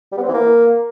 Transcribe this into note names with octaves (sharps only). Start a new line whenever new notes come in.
G3
B3
C4
E3
A#3